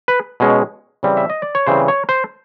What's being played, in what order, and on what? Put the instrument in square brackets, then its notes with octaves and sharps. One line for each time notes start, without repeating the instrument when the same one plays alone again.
[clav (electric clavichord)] B4
B2 G#3 C#4
C#3 E3 G3 C4
E5
D#5
D5
C#5
C#3 E3 G3 C4 C5
C#5
C5